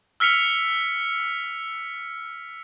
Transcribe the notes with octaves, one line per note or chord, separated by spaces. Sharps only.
E6 F6 B6 C#7 F7